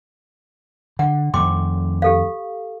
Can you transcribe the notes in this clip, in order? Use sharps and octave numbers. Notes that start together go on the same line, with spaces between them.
D3 F#5
F2 D#3 A3 G5 C6 D6
G4 A4 F5